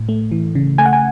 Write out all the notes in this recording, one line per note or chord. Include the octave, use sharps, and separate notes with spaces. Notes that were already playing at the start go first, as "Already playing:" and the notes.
Already playing: A2
A3
E3
C#3
A3 G#5
F#5
G#5